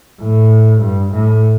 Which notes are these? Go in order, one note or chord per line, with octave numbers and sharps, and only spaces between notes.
A2
G2
A2